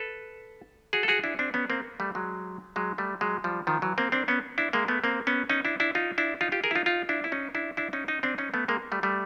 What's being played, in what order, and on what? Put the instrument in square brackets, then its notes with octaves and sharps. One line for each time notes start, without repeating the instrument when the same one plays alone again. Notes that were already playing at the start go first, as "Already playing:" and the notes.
Already playing: [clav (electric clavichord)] A4 B4
F#4 G#4
A4
F#4 G#4
D4 E4
C4 D4
B3 C#4
A#3 C4
G3 A3
F#3 G#3
F#3 G#3
G3 A3
F#3 G#3
F3 G3
D#3 F3
E3 F#3
A#3 C4
C4 D4
B3 C#4
D4 E4
G#3 A#3
A3 B3
A#3 C4
B3 C#4
C#4 D#4
D4 E4
D4 E4
D#4 F4
D4 E4
D#4 F4
F4 G4
G#4 A#4
E4
D#4 F4
D#4 F4
D4 E4
E4
C#4 D#4
D4 E4
D4 E4
C#4 D#4
C#4 D#4
C4 D4
C#4 D#4
A3 B3
G#3 A#3
G3 A3
G3 A3